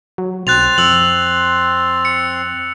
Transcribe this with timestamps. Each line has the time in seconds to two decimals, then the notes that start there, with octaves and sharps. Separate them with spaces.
0.18 F#3
0.47 B1 C4 C6 F#6 A6 F7
0.78 F2 E6 F#7
2.05 C#7